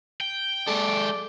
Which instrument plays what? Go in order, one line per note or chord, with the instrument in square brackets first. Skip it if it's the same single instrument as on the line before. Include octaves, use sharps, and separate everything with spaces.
[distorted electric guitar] G5
[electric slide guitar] G#3 A4 [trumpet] D5